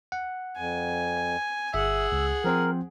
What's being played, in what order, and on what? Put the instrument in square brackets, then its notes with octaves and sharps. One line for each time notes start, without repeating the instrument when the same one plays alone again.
[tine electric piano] F#5
[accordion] F2 [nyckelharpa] G#5
[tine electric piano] G1 E5 [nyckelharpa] G#4 F#5 [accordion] E6
[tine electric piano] C#2
[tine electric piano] F3 C4 C5 [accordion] A#4